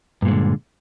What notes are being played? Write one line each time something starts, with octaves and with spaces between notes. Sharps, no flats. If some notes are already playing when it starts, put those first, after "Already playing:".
G2 A#2 D3 G#3